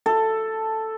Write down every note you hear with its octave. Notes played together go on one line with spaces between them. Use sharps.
A4